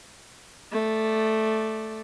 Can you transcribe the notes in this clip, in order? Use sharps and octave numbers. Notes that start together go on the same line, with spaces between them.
A3 D5